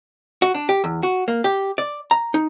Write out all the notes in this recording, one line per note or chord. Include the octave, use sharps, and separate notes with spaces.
F#4
D4
G4
E2
F#4
A#3
G4
D5
A#5
D#4